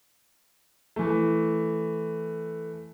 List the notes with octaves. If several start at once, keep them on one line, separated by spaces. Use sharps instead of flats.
E3 A3